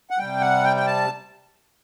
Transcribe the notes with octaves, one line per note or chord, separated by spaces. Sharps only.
F#5
C3 G3 G5
F#5
G5
G5
A5